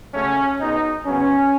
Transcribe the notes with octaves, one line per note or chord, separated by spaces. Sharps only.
C#3 F#3 A3 C#4
B2 G#3 B3 D#4
F#2 C#3 F#3 B3 C#4